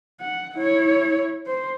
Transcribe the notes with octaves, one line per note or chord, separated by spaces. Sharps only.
F#5
E4 C#5
C5